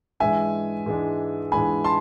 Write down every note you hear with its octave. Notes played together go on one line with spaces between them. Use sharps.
G#2 E3 G#3 D4 E5 G#5
G#2 E3 G#3 D4
G#2 E3 G#3 D4 G#5 B5
A5 C6